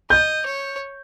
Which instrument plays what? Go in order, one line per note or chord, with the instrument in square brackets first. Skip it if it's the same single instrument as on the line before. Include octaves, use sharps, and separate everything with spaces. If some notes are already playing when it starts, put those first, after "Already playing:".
[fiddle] D#5 [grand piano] G6
[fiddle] C#5